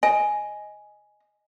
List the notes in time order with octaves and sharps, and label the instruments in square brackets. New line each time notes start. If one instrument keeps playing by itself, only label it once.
[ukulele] D#5 [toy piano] G#5